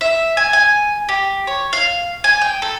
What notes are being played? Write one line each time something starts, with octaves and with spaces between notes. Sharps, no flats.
E5
G#5
G#5
G4
C#5
F5
G#5
G5
A4